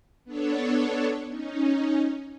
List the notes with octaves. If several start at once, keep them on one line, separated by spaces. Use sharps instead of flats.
B3 D4 A4 C#5
C#4 D#4